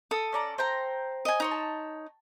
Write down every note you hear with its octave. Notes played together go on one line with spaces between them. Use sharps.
A4 D#6
C#4 D5 A#5
C5 G5 A#5
D#5 G#5
D#4 C#5 C6
A5